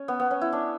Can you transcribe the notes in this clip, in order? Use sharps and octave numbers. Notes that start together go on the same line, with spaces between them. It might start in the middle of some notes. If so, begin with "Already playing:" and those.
Already playing: C#4
B3
B3
C#4
E4
D4